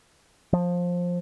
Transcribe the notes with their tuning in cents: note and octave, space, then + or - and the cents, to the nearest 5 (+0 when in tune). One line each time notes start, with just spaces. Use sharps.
F3 +15